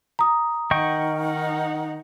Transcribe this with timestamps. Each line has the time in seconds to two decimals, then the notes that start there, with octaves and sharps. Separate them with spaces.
0.19 A#5 D#6
0.71 D#3 D#5 F#5 G5 C#6
1.20 D#4 F#5